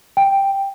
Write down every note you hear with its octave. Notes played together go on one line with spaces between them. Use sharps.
G5